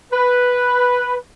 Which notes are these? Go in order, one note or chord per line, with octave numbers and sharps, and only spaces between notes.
B4